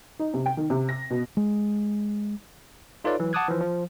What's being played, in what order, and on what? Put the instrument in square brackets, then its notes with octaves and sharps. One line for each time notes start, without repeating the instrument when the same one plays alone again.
[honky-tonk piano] D#4
C3
G5
D#3
C3
A#6
B2
[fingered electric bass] G#3
[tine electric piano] D#4 F4 A4 B4 C#5 D5
E3 F#3
F#5 A5 D6 D#6 F#6 G#6
E3 F3
F3